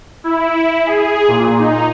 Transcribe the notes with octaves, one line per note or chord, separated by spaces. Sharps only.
E4
G#4
A#2
D#4